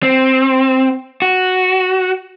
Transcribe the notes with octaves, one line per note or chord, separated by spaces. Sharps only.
C4
F#4